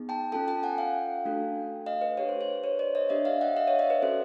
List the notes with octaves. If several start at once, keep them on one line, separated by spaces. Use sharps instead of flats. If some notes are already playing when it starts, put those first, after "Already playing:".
Already playing: B3 D#4 G#4
G5 A5
C#4 F4 A4 G5 A5
G5 A5
F#5 G#5
F5 G5
A3 D4 F#4 A4
D#5 F5
B4
D4 G4 B4 C#5
C5
C5
B4 C#5
C5 D5
C#5 D#5
D4 G4 D5 E5
D#5 F5
E5 F#5
D#5 F5
C#5 D#5
D5 E5
B4
C#4 F#4 A4 C5